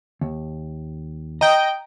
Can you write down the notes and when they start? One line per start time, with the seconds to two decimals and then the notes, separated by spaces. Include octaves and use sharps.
0.21 D#2
1.41 D#5 G5 A#5